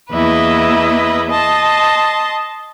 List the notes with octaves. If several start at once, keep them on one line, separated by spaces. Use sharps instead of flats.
E2 A#3 E4 B4 D#5
D#5 A5 C6